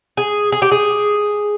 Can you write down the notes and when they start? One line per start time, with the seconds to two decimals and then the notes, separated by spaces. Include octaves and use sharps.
0.17 G#4
0.52 G#4
0.62 G4
0.72 G#4